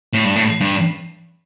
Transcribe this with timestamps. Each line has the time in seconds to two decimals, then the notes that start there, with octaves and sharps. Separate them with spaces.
0.13 A2
0.25 G2
0.36 A2
0.61 G2